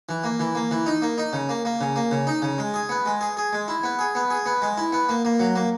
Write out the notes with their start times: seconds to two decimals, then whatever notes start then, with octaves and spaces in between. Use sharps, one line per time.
0.09 E3
0.24 A#3
0.40 E3
0.55 A#3
0.71 E3
0.86 D#4
1.02 A#3
1.18 D#4
1.33 C#3
1.49 A#3
1.65 A#3
1.81 C#3
1.96 A#3
2.11 C#3
2.27 D#4
2.42 C#3
2.58 G#3
2.74 G#4
2.89 B3
3.06 G#3
3.21 G#4
3.37 G#4
3.53 G#3
3.68 E4
3.83 B3
3.99 G#4
4.15 B3
4.30 G#4
4.46 B3
4.62 G#3
4.78 E4
4.92 B3
5.09 A#3
5.25 A#3
5.40 F#3
5.56 A#3